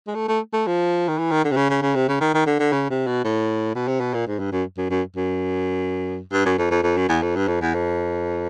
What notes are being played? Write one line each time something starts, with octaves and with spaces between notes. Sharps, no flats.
G#3
A3
A3
A3
F3
D#3
E3
D#3
D3
C3
C#3
C#3
C#3
C3
C#3
D#3
D#3
D3
D3
C#3
C3
B2
A2
B2
C3
B2
A#2
G#2
G2
F#2
F#2
F#2
F#2
G2
F#2
F2
F2
F2
F#2
E2
F2
G2
F2
E2
F2